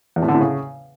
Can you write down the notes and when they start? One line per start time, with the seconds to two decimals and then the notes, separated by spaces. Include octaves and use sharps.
0.16 E2
0.22 A2
0.28 D3
0.34 A2
0.40 C#3